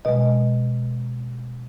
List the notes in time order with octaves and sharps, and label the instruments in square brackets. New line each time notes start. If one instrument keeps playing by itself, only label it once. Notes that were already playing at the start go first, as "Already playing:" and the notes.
[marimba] B2 G#3 D#5